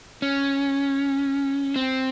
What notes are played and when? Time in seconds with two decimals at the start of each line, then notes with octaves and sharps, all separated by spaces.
0.22 C#4
1.76 C4